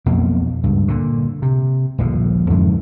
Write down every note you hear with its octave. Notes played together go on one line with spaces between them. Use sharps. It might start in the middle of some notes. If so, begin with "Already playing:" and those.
B1 F2 B2 A#3
C#2 G2
A#2 D3
C3
D#1 A#1 D3 F3
F2 G#2 D3 E3